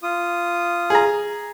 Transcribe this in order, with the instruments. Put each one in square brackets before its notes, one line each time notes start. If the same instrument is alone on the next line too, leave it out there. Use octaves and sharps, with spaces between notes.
[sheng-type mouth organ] F4 D#6
[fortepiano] G#4 A#5